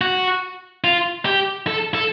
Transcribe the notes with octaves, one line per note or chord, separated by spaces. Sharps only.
F#4
F4
G4
A4
A4